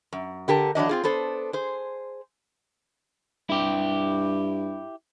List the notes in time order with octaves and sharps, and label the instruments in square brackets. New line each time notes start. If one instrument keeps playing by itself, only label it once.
[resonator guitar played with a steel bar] F#2
D3 G4 A#4 A5
E3 F#3 D4 D#5
C4 F4 G#4
B3 D4 A4 C5
G#4 C5
[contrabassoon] G2 [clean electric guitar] E4 G4